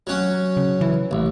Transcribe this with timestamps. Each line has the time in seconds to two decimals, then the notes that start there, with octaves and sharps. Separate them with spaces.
0.07 F#3 C#4
0.57 C#3
0.81 E3
1.11 A1